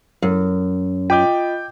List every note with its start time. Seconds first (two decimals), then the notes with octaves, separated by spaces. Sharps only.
0.22 F#2
1.10 F4 D#5 G5 D6 G6